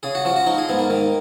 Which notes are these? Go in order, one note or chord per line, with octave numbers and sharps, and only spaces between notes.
C#3 G#4
F#4
F3 F#4
F#4
F3 D#4
G#4
G#2 B3
A#3
D#3